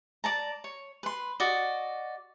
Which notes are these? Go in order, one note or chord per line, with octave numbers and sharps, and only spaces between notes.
D5 A5 A#5
C#5
B4 C6
F#4 D5 D#5